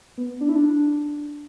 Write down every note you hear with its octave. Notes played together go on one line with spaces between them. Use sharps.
B3
D4
E4
D4